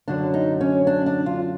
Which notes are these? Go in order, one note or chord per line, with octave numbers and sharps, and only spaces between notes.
F#2 D3 F#3 D4
D#4
C#4
D4
D4
F4